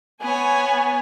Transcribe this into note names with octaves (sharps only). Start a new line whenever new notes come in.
B3 C#5 G#5